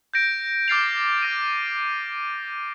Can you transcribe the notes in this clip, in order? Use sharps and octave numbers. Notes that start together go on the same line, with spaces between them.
G6 A#6 D7
D6 F6 A6 C7 F7
F6 A#6 D#7